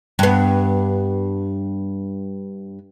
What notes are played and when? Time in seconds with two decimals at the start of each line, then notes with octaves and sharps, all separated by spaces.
0.19 G2 B3